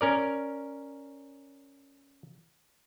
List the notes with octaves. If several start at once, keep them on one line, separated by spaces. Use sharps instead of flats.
C#4 A#4 D5